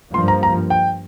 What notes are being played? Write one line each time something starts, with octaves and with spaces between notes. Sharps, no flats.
G2 F3 A#3 C6
A#5
A#5
G5